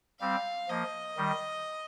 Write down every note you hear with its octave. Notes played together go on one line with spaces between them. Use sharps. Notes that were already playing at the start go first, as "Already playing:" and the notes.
G3 C4 F5
F3 A#3 D#5
D#3 G3